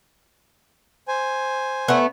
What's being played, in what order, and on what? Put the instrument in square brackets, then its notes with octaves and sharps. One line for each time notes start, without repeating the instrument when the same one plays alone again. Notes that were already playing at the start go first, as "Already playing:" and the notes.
[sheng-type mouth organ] C5 G#5
[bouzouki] A3 B3